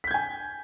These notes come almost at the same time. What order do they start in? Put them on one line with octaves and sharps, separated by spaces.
B6 G6 G#6 G#5